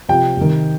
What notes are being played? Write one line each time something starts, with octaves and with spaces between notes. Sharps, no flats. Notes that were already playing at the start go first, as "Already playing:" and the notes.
C3 F3 G5
C3 D#3